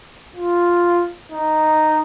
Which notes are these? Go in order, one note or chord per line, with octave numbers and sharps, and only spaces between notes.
F4
D#4